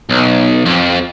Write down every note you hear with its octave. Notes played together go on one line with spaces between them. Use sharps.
B1
F2